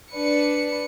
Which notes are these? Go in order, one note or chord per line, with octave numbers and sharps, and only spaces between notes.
D4 B4 C#7